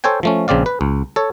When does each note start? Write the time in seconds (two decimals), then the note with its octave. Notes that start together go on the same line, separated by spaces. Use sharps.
0.04 A4 C5 C#5 G5 G#5
0.23 F3 A3 C#4
0.48 A#1 C#3 C4 D5 F5
0.66 B4
0.81 C#2
1.16 A4 C#5